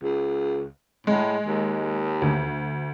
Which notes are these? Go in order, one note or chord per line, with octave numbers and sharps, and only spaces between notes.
C#2
A2 G#3
D#2
D2